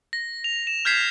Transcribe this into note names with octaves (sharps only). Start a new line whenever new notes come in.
A#6
F7
E7
F6 G6 G#6 B6 C7 E7